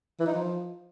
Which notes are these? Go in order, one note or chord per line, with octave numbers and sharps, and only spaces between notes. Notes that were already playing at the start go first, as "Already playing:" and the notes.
E3
D#4
F3